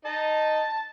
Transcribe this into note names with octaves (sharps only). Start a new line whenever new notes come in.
D#4 D#5 A5